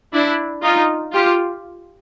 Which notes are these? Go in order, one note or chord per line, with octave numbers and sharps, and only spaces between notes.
D4 E4
D#4 F4
F4 G4